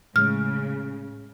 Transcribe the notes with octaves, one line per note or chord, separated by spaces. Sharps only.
A2 C#3 G#3 F6